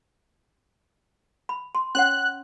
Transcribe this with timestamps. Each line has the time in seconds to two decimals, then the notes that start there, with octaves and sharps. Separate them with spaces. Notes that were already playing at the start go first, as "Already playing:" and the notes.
1.49 B5
1.75 C6
1.95 C#4 C#5 F#5 F#6